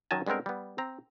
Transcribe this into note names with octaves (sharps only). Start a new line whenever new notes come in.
F#2 D#3 F#3 D#5 G#5 A5
G2 G#3 B3 C4 A#4
G3 B3
C4 A#5